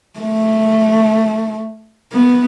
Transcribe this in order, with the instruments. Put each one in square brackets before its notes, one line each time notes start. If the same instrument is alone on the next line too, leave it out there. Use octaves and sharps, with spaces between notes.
[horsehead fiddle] A3
B3